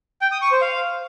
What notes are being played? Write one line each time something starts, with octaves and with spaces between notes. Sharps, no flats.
G5
D#6
C#6
C5
F5